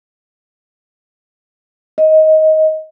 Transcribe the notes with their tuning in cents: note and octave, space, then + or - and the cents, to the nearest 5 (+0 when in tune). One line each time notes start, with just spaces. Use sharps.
D#5 +15